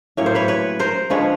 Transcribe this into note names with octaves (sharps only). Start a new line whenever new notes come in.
A2 F#3 A#3 C#4 C#5
C5
B4 C#5
B4 C#5
A#4 C5
D3 F3 G#3 C#4 B4 C#5